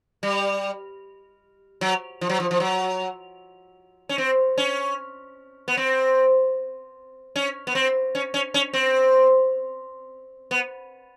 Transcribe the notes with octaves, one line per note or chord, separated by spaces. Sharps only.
G3
F#3
F3
F#3
F3
F3
F#3
C#4
C4
C#4
B3
C4
C#4
B3
C4
C#4
C#4
C#4
C4
B3